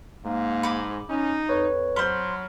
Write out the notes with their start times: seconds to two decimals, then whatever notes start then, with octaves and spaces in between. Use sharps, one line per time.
0.25 G#2 A#3
0.63 B5 D6
1.09 C#4 D#4
1.49 F2 B4 C#5
1.96 F#3 C5 B5 C6 F6